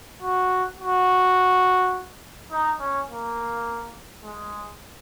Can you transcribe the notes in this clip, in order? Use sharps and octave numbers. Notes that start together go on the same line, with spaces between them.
F#4
F#4
D#4
C#4
A#3
G#3